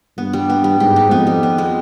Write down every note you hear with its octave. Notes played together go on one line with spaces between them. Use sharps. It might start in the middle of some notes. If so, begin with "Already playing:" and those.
G2 B3
G3
B3
G3
G#2 G4
D#4
F2 B3
G3
B3
G#3